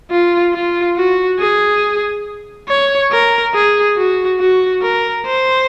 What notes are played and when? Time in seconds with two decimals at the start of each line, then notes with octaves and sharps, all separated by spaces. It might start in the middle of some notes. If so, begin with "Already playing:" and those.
0.11 F4
0.54 F4
0.96 F#4
1.39 G#4
2.68 C#5
3.11 A#4
3.54 G#4
3.97 F#4
4.40 F#4
4.82 A#4
5.26 C5